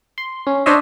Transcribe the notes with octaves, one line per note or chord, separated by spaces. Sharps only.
C6
C#4
D4 C5 C#5 D#5 E5